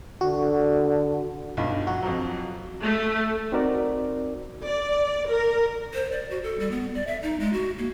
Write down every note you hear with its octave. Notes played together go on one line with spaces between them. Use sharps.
D3 F#4
B1 G2 F4
F#3 F#4
F2 F3 F#3
A3
C4 D#4 F#4 A#4 D5
D5
A#4
C5
D5
F#4
A4
G3
B3
D5
E5
D#4
G#3
F#4
A#3